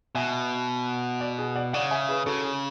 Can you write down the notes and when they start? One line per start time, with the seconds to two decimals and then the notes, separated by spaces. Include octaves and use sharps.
0.15 B2 E5 G#5
1.21 D5 F#5
1.38 G#4
1.56 D5 F#5
1.73 C#3 D5 F#5
1.91 E5 G#5
2.09 G#4 B4
2.26 C#3 F#4 A4
2.44 G#4